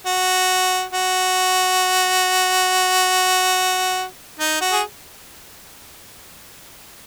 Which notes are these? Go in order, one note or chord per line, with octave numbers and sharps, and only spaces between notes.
F#4
F#4
D#4
F#4
G#4